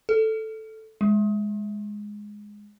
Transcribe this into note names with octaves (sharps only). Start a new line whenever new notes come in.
A4
G#3